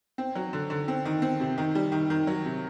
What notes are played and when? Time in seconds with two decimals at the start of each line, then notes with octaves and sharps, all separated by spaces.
0.18 C4
0.35 F#3
0.53 D3
0.70 D3
0.88 C4
1.05 D#3
1.22 C4
1.40 C3
1.58 D#3
1.75 G3
1.92 D#3
2.10 D#3
2.27 F#3
2.45 C3